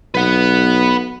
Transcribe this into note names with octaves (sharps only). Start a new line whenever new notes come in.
B1 B4 F#5